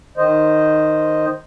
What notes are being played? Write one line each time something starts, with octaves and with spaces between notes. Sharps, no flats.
D#3 C5 D#5